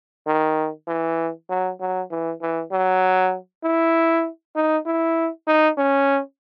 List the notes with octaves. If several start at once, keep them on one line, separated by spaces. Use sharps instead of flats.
D#3
E3
F#3
F#3
E3
E3
F#3
E4
D#4
E4
D#4
C#4